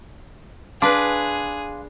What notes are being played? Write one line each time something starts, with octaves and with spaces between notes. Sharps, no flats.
D4 G#4 B4 F5 C6 D6